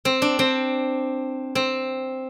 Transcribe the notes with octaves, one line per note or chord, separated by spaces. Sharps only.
C4
D4
C4
C4